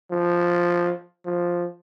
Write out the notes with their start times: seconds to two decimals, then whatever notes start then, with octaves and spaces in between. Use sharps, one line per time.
0.11 F3
1.26 F3